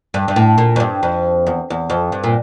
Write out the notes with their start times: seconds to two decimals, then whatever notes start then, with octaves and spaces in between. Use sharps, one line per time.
0.14 G2
0.28 G2
0.36 A2
0.58 A#2
0.76 F2
0.80 G2
1.03 F2
1.47 E2
1.70 E2
1.90 F2
2.12 G2
2.24 A#2